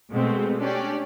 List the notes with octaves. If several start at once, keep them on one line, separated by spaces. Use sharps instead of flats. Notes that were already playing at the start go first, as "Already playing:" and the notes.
B2 G#3 A3 C4
C#4 D4 G4 D5